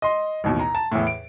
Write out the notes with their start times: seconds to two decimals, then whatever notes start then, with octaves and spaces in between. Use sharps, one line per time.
0.02 D#5 C6
0.44 A1 D#2 B2
0.59 A#5
0.75 A5
0.92 E2 A2
1.07 D7